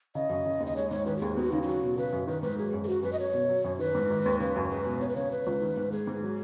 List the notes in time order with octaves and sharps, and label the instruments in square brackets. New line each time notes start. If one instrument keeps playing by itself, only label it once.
[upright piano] C#3 [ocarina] D#5
[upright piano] F#2
C#3
D#2
[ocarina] D#5
[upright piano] G#3 [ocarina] C#5
[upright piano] G#2 [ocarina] C#5
[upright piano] D#3 [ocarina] B4
[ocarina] F#4
[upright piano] D#2 [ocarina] G#4
[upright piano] B3 [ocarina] F#4
[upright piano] C#3 [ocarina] D#4
[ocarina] D#4
[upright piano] F#3 [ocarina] F#4
[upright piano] B2
[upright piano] C#3 [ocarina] B4
[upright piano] F#2
[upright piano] D#3 [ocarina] B4
[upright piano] G#2 [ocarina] B4
[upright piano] F#3 [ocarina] G#4
[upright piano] F#2
[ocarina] G#4
[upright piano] F#3 [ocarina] F#4
[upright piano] F#2 [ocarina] B4
[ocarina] D#5
[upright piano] F#3 [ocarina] C#5
[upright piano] B2
F#3
F#2
[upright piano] D#3 [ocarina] B4
[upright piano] G#2
D#3
D#2
[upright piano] C#3 [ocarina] B4
[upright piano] F#2
[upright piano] G#3 [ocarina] B4
[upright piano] B2
[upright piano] B3 [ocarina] C#5
[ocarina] B4
[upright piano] C#3 [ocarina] C#5
[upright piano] C#3 [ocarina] B4
[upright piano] C#2
D#3
G#2
[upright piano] G#3 [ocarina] G#4
[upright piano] G#2
F#3